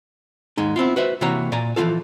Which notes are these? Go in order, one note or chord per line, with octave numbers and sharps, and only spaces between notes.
D#2 G#2 G#3 D#4
B3 C4 E4 F4
F#4 B4 C5 E5
C3 E3 A#3 F#4 C#5 A#5
A#2 D5 G#5 A#5
E3 F3 A#3 D#4 F4 A4